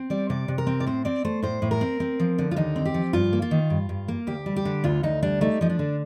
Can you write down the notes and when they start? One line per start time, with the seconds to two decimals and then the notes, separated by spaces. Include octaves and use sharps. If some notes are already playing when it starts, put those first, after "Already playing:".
Already playing: C4
0.10 G3 D5
0.30 C3 D5
0.48 C3
0.58 A#4
0.67 C4
0.80 D5
0.86 A2 C5
1.05 C4 D5
1.25 A3 C5
1.42 A2 C5
1.62 A2
1.71 A#4
1.81 C4
2.00 C4
2.20 F3
2.38 D3
2.51 F4
2.56 D#2 D#4
2.76 C4
2.85 G4
2.94 F3
3.13 G2 F4
3.33 A#3
3.42 F4
3.51 D#3
3.70 G2
3.89 G2
4.08 A#3
4.27 D2 G4
4.46 G3
4.56 G4
4.65 D3
4.84 D2 F4
5.03 D2 D#4
5.22 G3 D4
5.41 A3 D#4
5.61 F3 D#4
5.69 D4
5.79 D3